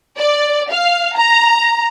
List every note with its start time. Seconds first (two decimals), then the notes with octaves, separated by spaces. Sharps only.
0.18 D5
0.71 F5
1.17 A#5